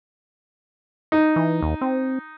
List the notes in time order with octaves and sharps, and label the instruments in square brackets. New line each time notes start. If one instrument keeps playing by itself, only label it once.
[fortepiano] D#4
[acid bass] E3
D#2
C4